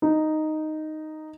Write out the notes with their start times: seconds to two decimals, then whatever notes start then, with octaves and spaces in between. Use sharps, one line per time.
0.02 D#4